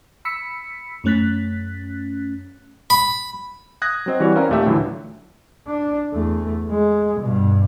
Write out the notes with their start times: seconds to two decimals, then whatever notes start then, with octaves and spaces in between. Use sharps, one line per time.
0.25 B5 E6 B6 C#7
1.04 F#2 A3 C#4 F#6 A6 B6
2.90 B5
3.82 D#6 F#6 G#6 A#6
4.06 F#3 C4 D#5
4.20 E3 G3 F#4 C#5 D5
4.35 C4 C#4 A#4 D5 F5 A#5
4.49 D#2 A#2 A3 G4 E5
4.66 A2 D3 E3 F#3
5.67 D4
6.13 E2 A3
6.69 G#3
7.20 G2 B2